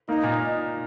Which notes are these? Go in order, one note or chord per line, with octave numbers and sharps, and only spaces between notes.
A#3 D#4
A#2